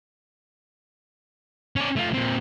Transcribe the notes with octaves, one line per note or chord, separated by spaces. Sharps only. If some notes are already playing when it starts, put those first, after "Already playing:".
C#4 D5
A3 F4
A#2 C4